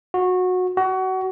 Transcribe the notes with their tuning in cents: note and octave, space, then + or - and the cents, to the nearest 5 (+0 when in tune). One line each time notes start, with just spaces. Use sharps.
F#4 -20
F#4 +25